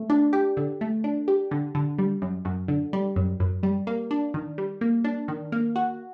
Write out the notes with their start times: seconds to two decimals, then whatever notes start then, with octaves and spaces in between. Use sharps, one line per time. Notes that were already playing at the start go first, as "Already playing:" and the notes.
Already playing: A3
0.10 D4
0.33 G4
0.57 D3
0.81 A3
1.04 D4
1.28 G4
1.51 D3
1.75 D3
1.98 G3
2.22 F#2
2.45 F#2
2.68 D3
2.93 G3
3.16 F#2
3.40 F#2
3.63 G3
3.87 A#3
4.11 D4
4.34 D#3
4.58 G3
4.81 A#3
5.04 D4
5.28 D#3
5.52 A#3
5.76 F#4